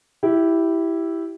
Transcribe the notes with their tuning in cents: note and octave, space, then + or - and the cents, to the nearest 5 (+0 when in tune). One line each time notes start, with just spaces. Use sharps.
E4 +0 G4 -10